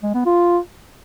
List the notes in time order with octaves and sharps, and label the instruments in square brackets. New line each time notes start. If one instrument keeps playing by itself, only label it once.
[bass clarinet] G#3
B3
F4